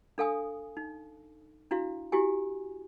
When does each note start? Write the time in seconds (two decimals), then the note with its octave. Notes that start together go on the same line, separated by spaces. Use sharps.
0.18 D4 A4 F5 G#5 D#6
0.77 D#4
1.71 D4 E4 F#4 F5
2.12 E4 F#4 G4 G#5